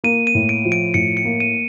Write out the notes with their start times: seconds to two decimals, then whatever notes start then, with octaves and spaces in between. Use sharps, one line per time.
0.04 A#3 D#7
0.27 D#7
0.34 A2
0.49 D7
0.65 F3
0.72 D7
0.94 A2 C#7
1.17 C#7
1.25 A#3
1.40 D#7